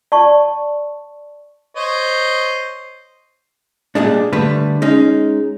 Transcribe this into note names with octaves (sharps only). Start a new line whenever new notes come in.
D5 A5 C#6
C5 C#5 D#5
A#2 G3 G#3 D4
D3 G3 A3 B4
G#3 C#4 D#4